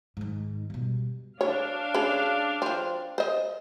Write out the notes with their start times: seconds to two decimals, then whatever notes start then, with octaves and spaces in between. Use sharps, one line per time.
0.17 G#2 D#3
0.70 B2 G3
1.41 D4 C#5 F5
1.95 C#3 A4
2.62 F3 C4
3.18 C5 D#5